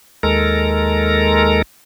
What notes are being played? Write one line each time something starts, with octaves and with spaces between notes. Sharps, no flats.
D#2 G#3 A4 A#4 A#5